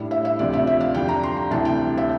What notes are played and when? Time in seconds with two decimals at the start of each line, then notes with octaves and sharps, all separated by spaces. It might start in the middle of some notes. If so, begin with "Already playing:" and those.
Already playing: A2 G3 D4
0.11 E5
0.25 E5
0.39 D2 C3 F3 D5
0.53 E5
0.67 E5
0.80 F5
0.94 F2 D3 G3 D4 G5
1.09 A#5
1.23 C6
1.37 A#5
1.51 D2 C3 E3 G3 A5
1.65 G5
1.97 E5